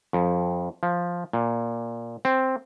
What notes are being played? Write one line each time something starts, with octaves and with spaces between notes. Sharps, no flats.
F2
F3
A#2
C4